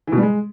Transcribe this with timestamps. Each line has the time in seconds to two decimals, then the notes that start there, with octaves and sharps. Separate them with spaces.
0.07 E3
0.12 B2
0.17 G3
0.23 G#3